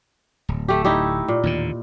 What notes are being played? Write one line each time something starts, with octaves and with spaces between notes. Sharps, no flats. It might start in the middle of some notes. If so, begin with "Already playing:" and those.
D1
A3 G4
D#4 E4 G4
A#2
D#2 A2 D3